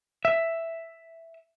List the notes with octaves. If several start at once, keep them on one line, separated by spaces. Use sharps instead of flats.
E5